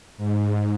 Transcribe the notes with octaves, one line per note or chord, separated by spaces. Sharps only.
G#2